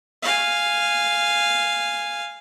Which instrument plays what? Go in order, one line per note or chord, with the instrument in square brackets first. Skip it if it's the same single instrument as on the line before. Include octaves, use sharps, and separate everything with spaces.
[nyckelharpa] F5 G#5